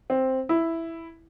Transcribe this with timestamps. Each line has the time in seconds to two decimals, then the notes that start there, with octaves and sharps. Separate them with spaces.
0.10 C4
0.49 E4